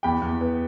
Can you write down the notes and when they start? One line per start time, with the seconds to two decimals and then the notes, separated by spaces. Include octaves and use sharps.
0.03 E2 G5 B5
0.21 E2
0.41 B3